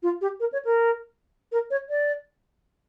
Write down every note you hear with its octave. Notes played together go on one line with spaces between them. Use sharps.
F4
G4
A#4
C#5
A#4
A#4
C#5
D5